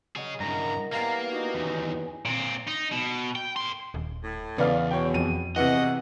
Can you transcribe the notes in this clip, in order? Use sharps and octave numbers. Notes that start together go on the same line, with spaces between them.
F#3 G#4 C#5 D#5
G2 C#3 E4 A#4 D#5 A#5
E3 G3 A#3 B3 F5 A#5
D#4 F#4
D#2 E3 C#4 G#4 G#5
A#2 C4
D#4
B2
G5
A#4 C6
D#1
A2
E2 C#3 B3 D5 F5
B2 C#5 G5
F2 D#7
E2 C3 E3 F#4 D#5 F#5